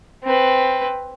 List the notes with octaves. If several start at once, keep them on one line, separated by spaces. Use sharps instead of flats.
C4 B4